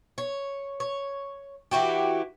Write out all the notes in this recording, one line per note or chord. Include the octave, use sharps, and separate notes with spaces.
C#5
C#5
E3 E4 F#4 G4